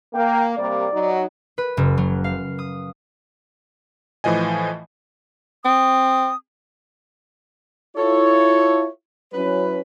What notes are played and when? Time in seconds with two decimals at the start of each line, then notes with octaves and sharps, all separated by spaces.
0.13 A#3 G5
0.57 C3 G3 A#3 D5
0.92 F#3 D#4
1.58 B4
1.77 F#1
1.98 F#3
2.24 F5
2.59 D#6
4.24 A2 E3 F3 D#5 G#5
5.65 C4 D#6
7.96 E4 F4 A4 C#5
9.33 F#3 C#4 E4 B4